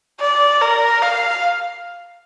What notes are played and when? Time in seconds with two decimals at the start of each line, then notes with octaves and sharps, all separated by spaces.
0.20 D5
0.61 A#4
1.02 F5